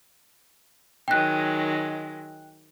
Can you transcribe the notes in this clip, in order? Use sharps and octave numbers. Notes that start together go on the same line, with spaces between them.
D#3 F#3 G#3 G5 F#6